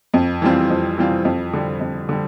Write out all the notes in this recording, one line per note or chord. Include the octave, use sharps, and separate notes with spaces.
F2
E3 G3 C4 F4
F2
E3 G3 C4 F4
F2
D3 G3
F2
D3 G3